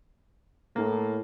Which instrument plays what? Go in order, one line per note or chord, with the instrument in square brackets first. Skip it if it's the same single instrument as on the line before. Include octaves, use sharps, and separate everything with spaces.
[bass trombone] A2 [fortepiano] A#3